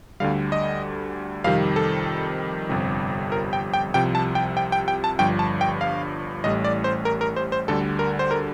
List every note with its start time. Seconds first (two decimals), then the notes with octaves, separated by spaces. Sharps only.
0.20 D2 D3 G3 F5
0.52 D#5
1.44 F2 C3 D#3 G3 F5
1.76 A4
2.69 G1 F2 C3 G3
3.32 A#4
3.53 G5
3.73 G5
3.94 C2 C3 F3 G5
4.15 A5
4.35 G5
4.57 G5
4.72 G5
4.88 G5
5.04 A5
5.19 G1 G2 F3 G5
5.39 A5
5.61 G5
5.81 F5
6.44 A1 A2 G3 D#5
6.64 D5
6.84 C5
7.05 A#4
7.21 A#4
7.36 C5
7.52 C5
7.68 D2 D3 G3 A4
7.99 A#4
8.19 C5
8.31 A#4